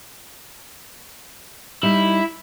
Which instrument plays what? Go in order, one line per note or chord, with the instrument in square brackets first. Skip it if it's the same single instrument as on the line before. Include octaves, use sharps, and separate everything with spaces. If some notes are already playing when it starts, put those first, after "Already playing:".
[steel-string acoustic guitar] G3 D#4 [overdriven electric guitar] E4